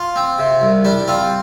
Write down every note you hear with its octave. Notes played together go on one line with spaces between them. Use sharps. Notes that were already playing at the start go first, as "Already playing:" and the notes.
Already playing: F4
C4
C3
C2
G3 D4
C4 F4